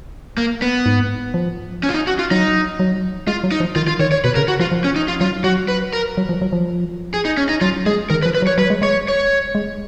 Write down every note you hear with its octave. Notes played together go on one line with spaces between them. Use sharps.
A#3
B3
G#2
F3
C#4
F4
D#4
F#4
F4
F#3 D#4
F#3
G#3 F4
F#3
D#4
F3
D#3 F4
F4
D#3 C#5
C#5
B2 B4
C#3 A#4
F#4
F3 F4
F3
C#4
D#4
F4
F#3 F4
F#3 F#4
B4
A#4
F#3
F3
F#3
F3
G#4
D#4
C#4
D#4
F#3 F4
G#3 G#4
D#3 A#4
B4
F3
B4
F#3
C#5
F#3 B4
G#3
G#3 C#5
C#5
G#3